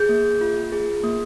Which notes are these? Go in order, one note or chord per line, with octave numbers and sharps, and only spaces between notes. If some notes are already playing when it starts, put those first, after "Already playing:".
Already playing: G#4 G6
A#3
F4
G#4
A#3